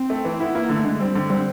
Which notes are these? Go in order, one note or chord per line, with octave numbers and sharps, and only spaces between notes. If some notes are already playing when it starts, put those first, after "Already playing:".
Already playing: C4
A3
E3
B3 E4
A#3 E4
D3 A3
D3 G#3
G3 C4
D3
G3 C4